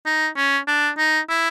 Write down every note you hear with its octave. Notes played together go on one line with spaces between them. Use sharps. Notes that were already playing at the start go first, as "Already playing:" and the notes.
D#4
C#4
D4
D#4
E4